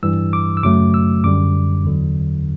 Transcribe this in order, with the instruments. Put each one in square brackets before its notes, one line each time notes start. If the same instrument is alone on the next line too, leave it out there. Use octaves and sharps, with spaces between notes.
[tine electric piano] G2 E3 G3 E6
D6
E6
F#2 C#3 F#3 A3 D6
E6
F#2 D3 G3 D6
E2 D3 F#3